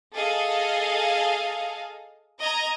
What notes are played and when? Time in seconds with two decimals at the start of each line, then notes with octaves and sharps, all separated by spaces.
0.15 G#4 A4 D#5 F5
2.39 D#5 A#5 G#6